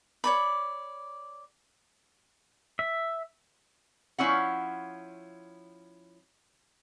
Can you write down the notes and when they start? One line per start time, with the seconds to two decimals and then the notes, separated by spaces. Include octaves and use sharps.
0.24 C#5 D5 B5
2.79 E5
4.18 F3 C#4 E4 F#5